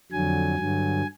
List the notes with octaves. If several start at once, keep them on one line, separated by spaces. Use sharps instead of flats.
F2 D3 F#3 G#5
G2 D3 F#3